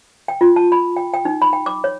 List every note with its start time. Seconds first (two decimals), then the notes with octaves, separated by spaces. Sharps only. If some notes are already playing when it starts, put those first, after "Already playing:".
0.28 G5
0.41 F4
0.56 A5
0.72 B5
0.97 G5
1.14 G5
1.25 D#4
1.42 B5
1.53 G5
1.66 D6
1.84 C#5